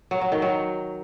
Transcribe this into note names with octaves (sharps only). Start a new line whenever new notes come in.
F#3
F#3
D#3
F#3